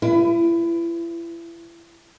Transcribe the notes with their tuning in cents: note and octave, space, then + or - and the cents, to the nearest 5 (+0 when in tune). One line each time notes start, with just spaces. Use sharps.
E4 +35 B4 +20